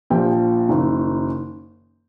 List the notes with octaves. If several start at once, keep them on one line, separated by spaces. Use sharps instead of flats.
A#1 A#2 F3 G4 G5
F#1 F#2 D#3